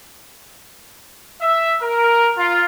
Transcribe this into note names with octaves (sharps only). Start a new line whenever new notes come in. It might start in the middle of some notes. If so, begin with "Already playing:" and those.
E5
A#4
F4